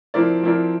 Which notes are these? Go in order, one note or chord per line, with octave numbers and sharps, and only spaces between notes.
F3 C4 E4 A#4 D5
F3 C4 E4 A#4 D5